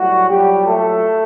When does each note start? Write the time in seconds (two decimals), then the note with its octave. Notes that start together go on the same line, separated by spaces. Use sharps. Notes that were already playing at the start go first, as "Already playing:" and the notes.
Already playing: A2 F#3 G3 F#4
0.29 A#2 F#3 G3 G4
0.67 A3 A4